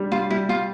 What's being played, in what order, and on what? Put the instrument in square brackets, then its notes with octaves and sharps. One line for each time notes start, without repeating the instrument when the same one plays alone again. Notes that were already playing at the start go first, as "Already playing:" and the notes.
Already playing: [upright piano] G3 D4
[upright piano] G3 [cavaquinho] F4
[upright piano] G3 [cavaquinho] E4
[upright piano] G3 [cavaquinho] F4